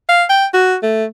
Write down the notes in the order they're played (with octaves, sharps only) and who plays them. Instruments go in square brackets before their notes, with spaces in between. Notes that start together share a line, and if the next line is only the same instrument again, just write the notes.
[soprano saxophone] F5
G5
F#4
A3